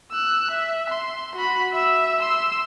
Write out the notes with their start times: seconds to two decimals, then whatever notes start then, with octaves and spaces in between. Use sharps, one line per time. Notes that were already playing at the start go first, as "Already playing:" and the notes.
0.12 E6 F#6
0.51 E5
0.90 C6
1.36 F#4 B5
1.73 E5 E6
2.20 C6 E6